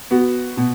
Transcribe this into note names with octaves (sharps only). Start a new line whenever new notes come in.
B3 F#4
B2